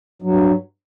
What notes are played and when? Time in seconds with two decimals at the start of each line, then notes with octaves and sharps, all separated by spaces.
0.22 G2 F#3